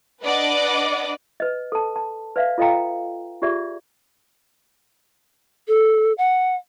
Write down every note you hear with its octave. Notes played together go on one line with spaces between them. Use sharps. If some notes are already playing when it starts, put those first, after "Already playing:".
D4 B4 D5 D#5 F#5 D6
B4 D#5
A4 A5
A5
B4 D5 E5 F5
F4 A4 D#5 F5 G5 A#5
F4 G4 G#4 D5 E5
A4
F#5